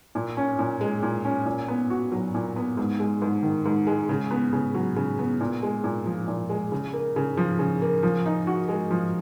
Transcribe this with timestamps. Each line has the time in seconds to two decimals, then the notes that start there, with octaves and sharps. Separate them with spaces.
0.15 A#2
0.37 C#4
0.59 A#2
0.81 G#3
1.03 A#2
1.25 C#4
1.46 A#2
1.68 B3
1.90 F#4
2.12 F#3
2.34 A#2
2.56 B3
2.77 G#2
3.00 G#3
3.22 G#2
3.43 D#3
3.66 G#2
3.87 G#3
4.09 C#3
4.31 B3
4.53 C#3
4.74 F#3
4.96 C#3
5.19 B3
5.41 A#2
5.63 G#3
5.84 A#2
6.06 F3
6.28 A#2
6.49 G#3
6.72 C#3
6.93 A#3
7.16 C#3
7.37 F3
7.59 C#3
7.82 A#3
8.03 F3
8.26 D#4
8.47 F#4
8.68 G#3
8.91 F3